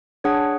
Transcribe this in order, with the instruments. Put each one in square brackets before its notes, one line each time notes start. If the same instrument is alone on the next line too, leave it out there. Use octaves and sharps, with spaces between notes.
[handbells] D4 G#4 C#5 F#5